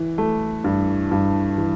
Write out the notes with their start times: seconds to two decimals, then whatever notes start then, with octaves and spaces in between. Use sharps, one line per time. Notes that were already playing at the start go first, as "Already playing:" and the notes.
Already playing: E3
0.18 A3
0.64 G2
1.12 G2
1.58 E3